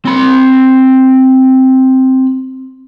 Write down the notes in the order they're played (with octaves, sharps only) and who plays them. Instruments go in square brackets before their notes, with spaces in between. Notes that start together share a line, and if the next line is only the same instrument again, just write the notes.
[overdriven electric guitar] C4 B5